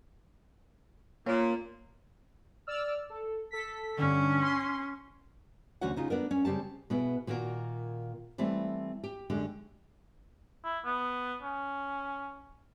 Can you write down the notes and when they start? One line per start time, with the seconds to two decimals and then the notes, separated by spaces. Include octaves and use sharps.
1.26 A#2 A#3 C#4
2.67 D5 E6 F6
3.10 A4
3.51 A4 B6
3.98 G2 D3 C#4
4.42 C6
5.81 D2 E3 C#4 F#4 C#5 F#5
5.96 C#3 D#4 F4
6.10 B3 D4 A#4
6.31 C#4
6.45 C#3 G3 C4 G4 A5
6.90 B2 B3 E4 G#4
7.27 A#2 D#3 A#3 F#4 A#4
8.38 E3 G3 A3 C4
9.04 G4
9.30 F#2 D3 G#3 G4
10.64 E4
10.85 B3
11.43 C#4